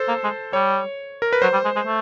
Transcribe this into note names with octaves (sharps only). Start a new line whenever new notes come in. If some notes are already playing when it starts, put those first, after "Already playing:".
Already playing: A4 C5
A#3
G#3
G3 C#5
A#4
B4
F#3 C5
G3
G#3
G#3
A3